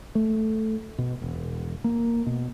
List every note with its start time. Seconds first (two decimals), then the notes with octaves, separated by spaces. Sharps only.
0.15 A3
0.98 B2
1.22 E1
1.84 A#3
2.26 B2